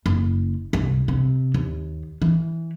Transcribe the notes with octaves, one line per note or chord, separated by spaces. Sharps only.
F#1
C2
C3
D#2
E3